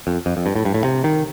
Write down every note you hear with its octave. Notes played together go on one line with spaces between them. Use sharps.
F2
F2
F2
G2
A2
G2
A2
C3
D#3